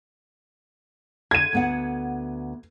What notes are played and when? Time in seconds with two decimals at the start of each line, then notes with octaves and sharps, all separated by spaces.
1.31 D3 G#6 D#7
1.53 D2 B3 F#5